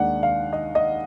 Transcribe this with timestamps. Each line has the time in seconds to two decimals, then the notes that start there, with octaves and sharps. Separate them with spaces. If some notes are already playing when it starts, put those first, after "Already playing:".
Already playing: D#2 D#3 G#3 D4 F#5
0.23 F5
0.53 D#5
0.75 D#5